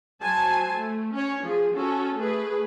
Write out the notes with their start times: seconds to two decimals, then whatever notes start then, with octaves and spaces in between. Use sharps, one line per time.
0.22 F#3 C5 G#5 A5
0.73 A3
1.13 C#4 C#5
1.43 F3 G#4
1.74 C#4 F#4 A4
2.16 A3 G#4 B4